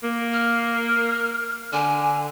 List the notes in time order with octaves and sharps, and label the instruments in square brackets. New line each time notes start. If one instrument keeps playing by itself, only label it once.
[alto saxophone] A#3
[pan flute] F6
[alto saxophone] D3 [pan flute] G#5